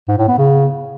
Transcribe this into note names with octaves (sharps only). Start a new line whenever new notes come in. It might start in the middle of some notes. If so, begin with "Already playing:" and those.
G#2
A2
B3
C#3